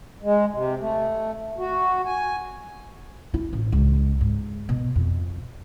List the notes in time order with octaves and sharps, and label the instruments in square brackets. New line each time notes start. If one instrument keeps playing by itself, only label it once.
[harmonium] G#3
C3
A3
F#4
G#5
[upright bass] E4
A1
C#2
G#2
B2
F2